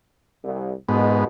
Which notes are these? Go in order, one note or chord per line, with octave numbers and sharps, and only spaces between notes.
C2
A#1 G#2 B2 B3